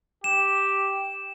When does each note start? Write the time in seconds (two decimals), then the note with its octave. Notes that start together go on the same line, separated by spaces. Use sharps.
0.24 G4 E7